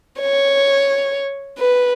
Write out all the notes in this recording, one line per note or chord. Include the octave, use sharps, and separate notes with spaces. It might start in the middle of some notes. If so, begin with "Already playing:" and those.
C#5
B4